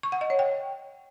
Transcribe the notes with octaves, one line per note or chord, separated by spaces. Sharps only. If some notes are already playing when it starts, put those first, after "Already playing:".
C#6
F#5
D#5
C#5
G5